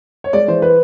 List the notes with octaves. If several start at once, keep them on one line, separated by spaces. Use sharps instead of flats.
C#5
G#3 D5
E3 C5
B4